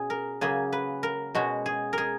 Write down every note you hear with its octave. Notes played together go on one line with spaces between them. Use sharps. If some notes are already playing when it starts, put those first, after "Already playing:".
Already playing: B2 C#4 G#4
A#4
C#3 F#3 A#3 G#4
B4
A#4
B2 G#3 C#4 F#4
G#4
G#4 A#4